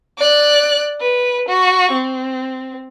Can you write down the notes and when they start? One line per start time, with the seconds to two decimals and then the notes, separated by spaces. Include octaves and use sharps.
0.18 D5 F#6
1.01 B4
1.48 F#4 C#6
1.92 C4